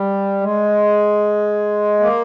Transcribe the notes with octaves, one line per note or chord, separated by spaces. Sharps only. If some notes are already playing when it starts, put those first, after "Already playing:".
Already playing: G3
G#3
A#3